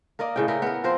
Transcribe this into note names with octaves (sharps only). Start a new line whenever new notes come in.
A#3 A#4 D5 D#5
A2 C#3 G5
C#3 E4 A#4 G5
B3 A#4
F3 C4 A#4 C5